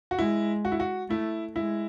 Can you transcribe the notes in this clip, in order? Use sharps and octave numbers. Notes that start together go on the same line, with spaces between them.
F#4
G#3 E4
F#4
E4
F#4
A3 E4
G#3 E4